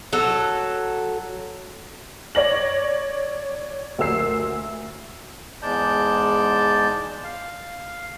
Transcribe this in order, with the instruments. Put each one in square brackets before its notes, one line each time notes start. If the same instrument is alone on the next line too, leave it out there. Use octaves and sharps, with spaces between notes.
[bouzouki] F#3 A4
[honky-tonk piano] C#5 D5 A#6 F#7
D2 A#4 E6 C7
[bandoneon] E2 G#2 G#3 D5 A5 G6
F5